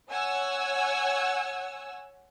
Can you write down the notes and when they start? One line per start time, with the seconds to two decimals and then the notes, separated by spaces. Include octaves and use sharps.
0.11 C#5 F#5 G#5 E6